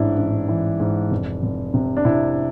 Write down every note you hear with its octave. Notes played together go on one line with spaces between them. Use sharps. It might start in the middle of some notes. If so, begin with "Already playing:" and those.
Already playing: A1 G#2 D4 E4
A1
E3
G#2
F1
F1
C3
D4
C3 E4